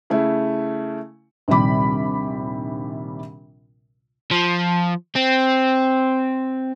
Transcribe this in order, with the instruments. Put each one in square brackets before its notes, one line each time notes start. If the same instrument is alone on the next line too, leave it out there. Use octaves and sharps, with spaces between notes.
[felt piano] C#3 A3 E4
A#1 D#2 C3 G3 B5 D6
[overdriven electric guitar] F3
C4